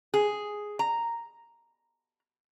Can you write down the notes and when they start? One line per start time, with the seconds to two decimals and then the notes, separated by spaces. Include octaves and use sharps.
0.14 G#4
0.79 A#5